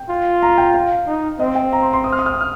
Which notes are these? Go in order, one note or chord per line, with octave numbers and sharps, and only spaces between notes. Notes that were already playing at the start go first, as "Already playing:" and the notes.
Already playing: G5
F4
A#5
G5
F5
D#4
C4 D#5
G5
A#5
C6
C6
D#6
F6
D#6
F6
D#6
F6